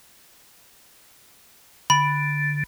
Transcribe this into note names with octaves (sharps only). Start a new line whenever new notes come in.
D3 B5